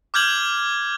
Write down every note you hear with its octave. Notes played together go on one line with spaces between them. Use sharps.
D6 F6 G6 G#6 F#7